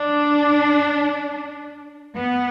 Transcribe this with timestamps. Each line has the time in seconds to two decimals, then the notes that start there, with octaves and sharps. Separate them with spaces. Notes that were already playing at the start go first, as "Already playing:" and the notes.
Already playing: D4
2.15 B3